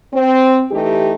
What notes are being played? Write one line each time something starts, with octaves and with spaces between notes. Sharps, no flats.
C4
E3 A3 D#4 G4